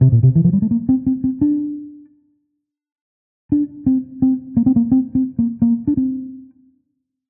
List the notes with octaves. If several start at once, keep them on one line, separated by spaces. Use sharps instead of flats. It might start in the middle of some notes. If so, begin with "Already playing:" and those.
C3
A#2
C3
E3
F3
G3
A3
A#3
C4
C4
C4
D4
D4
C4
C4
A#3
C4
A#3
C4
C4
A#3
A#3
D4
C4